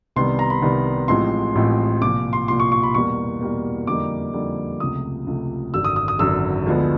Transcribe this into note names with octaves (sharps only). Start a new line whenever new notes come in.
C2 C3 D#3 G3 B3 C6
A#5
B5
C2 C3 D#3 G3 B3
A1 A2 F3 G#3 C4 C6
A1 A2 F3 G#3 C4
C2 A#2 F3 D6
C6
C2 A#2 F3 C6
C#6
C#6
B5
E2 B2 G3 A#3 C#6
E2 B2 G3 A#3
F2 D3 G3 A#3 D#4 D6
F2 D3 G3 A#3 D#4
C#2 C3 F3 A3 D#6
C#2 C3 F3 A3
G#1 F#2 D3 F#3 E6
D#6
D#6
D#6
G#1 F#2 D3 F#3 E6
D2 D3 F3 G#3 B3